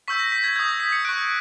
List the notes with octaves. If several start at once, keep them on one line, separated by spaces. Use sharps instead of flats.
C#6 E6 G6 B6
A#6
B6
G#6
D#6 G6 G#6
A#6
B6
C#7
C#6 F#6 D7